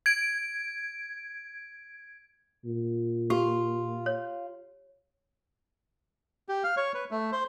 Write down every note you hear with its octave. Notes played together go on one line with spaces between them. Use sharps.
G#6 D7
A#2
F4 G4
C#5
G4
F5
C#5
B4
A3
C5